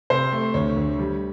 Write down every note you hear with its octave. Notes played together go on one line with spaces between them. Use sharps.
C3 C5
A3
D2 C#5
D2
G3